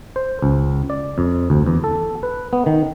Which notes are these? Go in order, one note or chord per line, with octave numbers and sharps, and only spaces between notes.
C5
C#2
D5
F2
D2
E2
A4
B4
B3
D#3